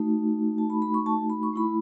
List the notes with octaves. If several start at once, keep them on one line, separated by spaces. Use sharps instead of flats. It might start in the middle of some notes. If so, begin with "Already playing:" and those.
Already playing: A3 D#4 F#4
A5
B5
B5
C#6
A5
B5
C#6
A3 E4 B5